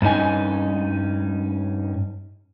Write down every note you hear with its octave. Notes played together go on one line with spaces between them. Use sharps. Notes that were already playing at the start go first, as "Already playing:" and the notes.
G2 C#4 D#4 G#5